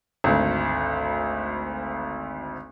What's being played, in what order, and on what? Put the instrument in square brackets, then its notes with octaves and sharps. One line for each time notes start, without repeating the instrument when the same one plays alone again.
[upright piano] G#1 D2